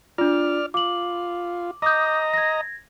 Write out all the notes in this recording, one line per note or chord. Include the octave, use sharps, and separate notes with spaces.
D4 F4 D5 F6
F4 D6 F#7
D#5 A#5 D6 D#6 G6
G#6 A#6